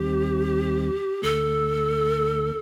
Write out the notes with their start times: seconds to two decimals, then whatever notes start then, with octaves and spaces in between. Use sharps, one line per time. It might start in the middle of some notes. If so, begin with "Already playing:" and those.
Already playing: D#2 D#3 G3 C4 G4
1.22 D2 D3 A3 A4